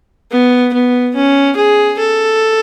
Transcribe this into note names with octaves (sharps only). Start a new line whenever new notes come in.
B3
B3
C#4
G#4
A4